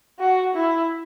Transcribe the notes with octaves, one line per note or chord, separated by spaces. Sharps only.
F#4
E4